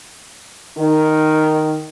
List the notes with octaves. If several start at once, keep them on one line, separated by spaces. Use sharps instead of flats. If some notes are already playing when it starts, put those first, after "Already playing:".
D#3